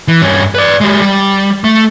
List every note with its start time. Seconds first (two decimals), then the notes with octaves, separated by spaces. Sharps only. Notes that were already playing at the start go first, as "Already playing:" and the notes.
0.08 E3
0.22 G2 C#4
0.55 B4 D5
0.81 G#3 G4
1.02 G3
1.64 A3